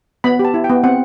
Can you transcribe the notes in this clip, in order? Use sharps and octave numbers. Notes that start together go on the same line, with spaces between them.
B3 B5
G4
A5
E4
G5
B3
C4 F#5